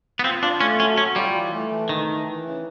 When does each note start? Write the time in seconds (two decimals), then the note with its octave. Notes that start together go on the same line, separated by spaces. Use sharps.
0.19 B3
0.24 C4 F4
0.43 D4 F4
0.61 A3 C#4
0.79 F#3 C#4
0.97 F#3 C#4
1.16 G3 F4
1.35 E3
1.53 A3
1.71 E3
1.89 D#3 A3
2.08 E3
2.27 E3
2.45 C#3